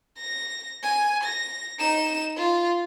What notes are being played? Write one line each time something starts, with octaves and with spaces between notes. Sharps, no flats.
A#6
G#5
A#6
D#4 E7
F4